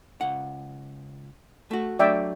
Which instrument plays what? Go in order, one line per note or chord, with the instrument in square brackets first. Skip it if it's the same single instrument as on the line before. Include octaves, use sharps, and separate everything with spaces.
[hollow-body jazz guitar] C#2 F#5
A3 F#4
[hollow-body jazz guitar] F#3 A3 D4 [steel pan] D5 E5 G5